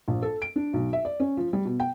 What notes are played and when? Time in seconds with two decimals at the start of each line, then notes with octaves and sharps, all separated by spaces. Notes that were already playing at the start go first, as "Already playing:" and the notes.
0.08 A#1
0.22 A4
0.42 D7
0.56 D4
0.73 B1
0.93 E5
1.05 D5
1.20 C#4
1.37 F3
1.53 G3
1.65 B2
1.80 G5